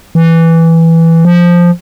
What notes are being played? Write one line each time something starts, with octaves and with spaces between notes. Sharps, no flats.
E3
F3